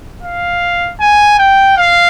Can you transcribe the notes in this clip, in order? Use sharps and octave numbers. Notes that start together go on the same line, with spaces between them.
F5
G#5
G5
F5